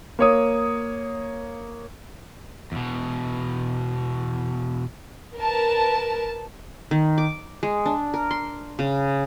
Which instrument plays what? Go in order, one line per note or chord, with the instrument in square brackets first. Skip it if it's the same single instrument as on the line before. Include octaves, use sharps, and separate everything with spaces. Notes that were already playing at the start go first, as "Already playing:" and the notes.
[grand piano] A#3 C#5 D#6
[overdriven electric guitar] E2 B2
[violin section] A#4 B4 A5
[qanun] D#3
D6
G#3
D4
A#4
C6
C#3